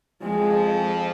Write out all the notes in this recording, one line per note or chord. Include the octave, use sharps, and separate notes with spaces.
F2 F3 G#3